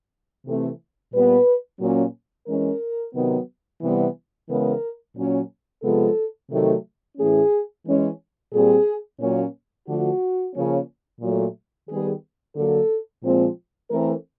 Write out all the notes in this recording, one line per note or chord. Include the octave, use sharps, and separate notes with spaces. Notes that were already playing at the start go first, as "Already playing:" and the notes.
C3 E3 A3 C4
A#2 G3 B3 B4
A#2 F#3 A#3 C#4
E3 G#3 C#4 A#4
C3 D#3 F#3 B3
C3 E3 G3 B3
C#3 E3 G#3 B3 A#4
A#2 F#3 A#3 C#4
C3 F3 G#3 B3 A4
C3 D#3 F#3 A3
A2 E3 A3 C#4 G#4
E3 G#3 C#4
A#2 G3 C4 G#4
A#2 F#3 A#3 C#4
D3 F3 A3 F#4
C#3 F3 A#3 C#4
A#2 F#3 A3
D#3 G3 B3 G#4
D3 F#3 A#3 A4
A#2 F3 G#3 C4
E3 A3 C4 A#4